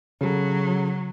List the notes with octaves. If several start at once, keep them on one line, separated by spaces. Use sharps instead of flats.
C#3 F#3 A4